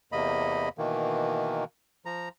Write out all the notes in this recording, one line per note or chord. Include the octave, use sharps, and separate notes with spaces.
E2 C3 A#3 D#5 B5
B2 D#3 E3 A#3
F3 A#5